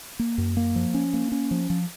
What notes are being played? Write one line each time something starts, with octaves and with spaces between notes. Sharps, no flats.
A#3
F#2
A#3
F3
C#4
A#3
C#4
F3
F3